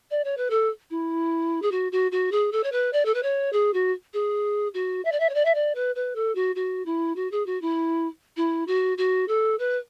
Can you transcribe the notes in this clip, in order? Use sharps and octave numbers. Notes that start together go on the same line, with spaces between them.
D5
C#5
B4
A4
E4
G#4
F#4
F#4
F#4
G#4
A4
C#5
B4
D5
A4
B4
C#5
G#4
F#4
G#4
F#4
E5
D5
E5
C#5
D5
E5
D5
B4
B4
A4
F#4
F#4
E4
F#4
G#4
F#4
E4
E4
F#4
F#4
A4
B4